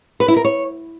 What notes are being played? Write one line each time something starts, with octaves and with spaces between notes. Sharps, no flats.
B4
E4
A#4
C#5